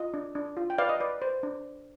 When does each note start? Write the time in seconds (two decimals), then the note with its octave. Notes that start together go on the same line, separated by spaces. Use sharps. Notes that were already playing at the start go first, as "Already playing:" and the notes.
Already playing: F4 D#5
0.14 D4
0.35 D4
0.57 F4
0.70 G5
0.78 B4 D5 F5
0.89 D#5
1.00 B4 D5
1.22 C5
1.43 D4